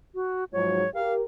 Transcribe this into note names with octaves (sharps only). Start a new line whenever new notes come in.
F#4
G#2 F3 F#3 C#5
G4 A#4 F5